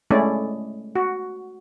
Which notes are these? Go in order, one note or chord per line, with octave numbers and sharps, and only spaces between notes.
G#3 A3 C#4 E4 D5
F#4